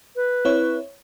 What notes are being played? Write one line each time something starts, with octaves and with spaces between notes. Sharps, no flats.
B4
C4 E4 C#5